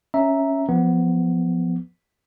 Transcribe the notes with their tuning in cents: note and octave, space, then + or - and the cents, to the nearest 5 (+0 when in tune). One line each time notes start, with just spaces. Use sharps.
C#4 +0 E5 -5 A#5 +0
F3 +0 B3 +5